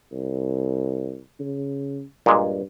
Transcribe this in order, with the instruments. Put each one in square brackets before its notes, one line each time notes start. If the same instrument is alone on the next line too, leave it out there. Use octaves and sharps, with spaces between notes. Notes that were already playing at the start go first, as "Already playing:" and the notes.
[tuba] C2
C#3
[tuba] G2 [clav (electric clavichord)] A#2 G#3